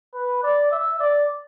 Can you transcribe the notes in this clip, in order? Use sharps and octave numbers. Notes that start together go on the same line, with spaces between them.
B4
D5
E5
D5